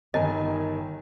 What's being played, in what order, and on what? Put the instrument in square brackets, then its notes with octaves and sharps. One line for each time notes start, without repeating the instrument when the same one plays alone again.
[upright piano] G1 A#4 G#5 [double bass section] D#3 [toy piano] D#5